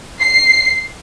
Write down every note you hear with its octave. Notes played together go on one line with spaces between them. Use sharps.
C7